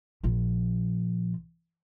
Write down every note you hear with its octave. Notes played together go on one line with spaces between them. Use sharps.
A#1 F3